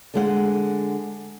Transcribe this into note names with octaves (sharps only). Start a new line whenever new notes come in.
D3 G#3 F#5